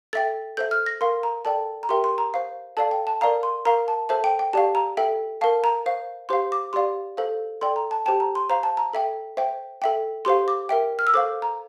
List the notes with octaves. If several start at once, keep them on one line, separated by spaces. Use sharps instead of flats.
A4 E5 G5 A6
A4 C5 E5 G6
F6
A#6
A#4 F5 C6
A#5
A4 D5 G5 A5
A#5
G4 A#4 E5 G5 C6
C6
A#5
C5 F5
A4 D5 F5 A5
G5
A5
A#4 D5 F5 A#5
C6
A#4 F5 A#5
A5
A4 C5 E5 A5
G5
G5
G4 D5 F5 A5
A#5
A4 E5 G5
A#4 F5 A5
A#5
C5 F5
G4 C5 F5 C6
D6
G4 D5 F5 C6
A4 C5 F5
A4 D5 G5 C6
A#5
A5
G4 C5 G5 A5
A#5
C6
C5 F5 A#5
A5
A#5
A4 E5 G5
C5 E5 G5
A4 E5 G5
G4 C5 F5 C6
D6
A#4 E5 G5
F6
E6
A4 C5 F5 D6
A#5